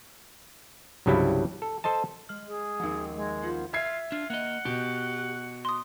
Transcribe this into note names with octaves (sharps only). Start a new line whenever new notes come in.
C2 G2 C#3 F#3 G3 E4
A4
A4 C5 D#5 A5
G#3 F6
G#4
D#2 F3 C4 C#4 D#4
G#3
B3 F4 C5 F#5
F4 E5 G#6 C7
D4 F4
A#3 D#5 F#5
B2 G4
C6 D#6